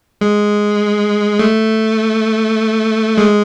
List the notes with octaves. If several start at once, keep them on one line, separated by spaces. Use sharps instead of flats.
G#3
A3
G#3